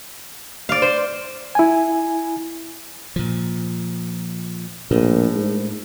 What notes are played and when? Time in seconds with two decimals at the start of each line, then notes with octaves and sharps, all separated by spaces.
0.69 D5 F5
0.82 C5
1.55 E4 G#5
3.16 A#2 F3
4.91 A#1 A2
5.35 G#2